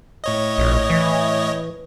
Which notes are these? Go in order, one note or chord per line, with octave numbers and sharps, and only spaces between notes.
A2 C#5 D#5
A#1
E3